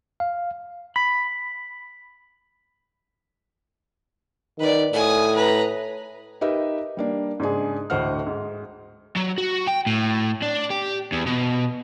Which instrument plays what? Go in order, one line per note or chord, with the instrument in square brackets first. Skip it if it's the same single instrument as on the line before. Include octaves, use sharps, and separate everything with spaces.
[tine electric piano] F5
[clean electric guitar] B5 [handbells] B6
[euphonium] D#3 [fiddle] B4 D5
[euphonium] A2 [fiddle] G#5 D#6
[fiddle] B4 A#5
[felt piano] D#4 G4 A#4 B4 D#5 E5
G3 A#3 D4
G#2 C#3 D4 G#4
D2 A2 C5 D#5 F#5 F6
G#2
[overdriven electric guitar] F#3
F#4
G5
A2
D4
G4
E2
B2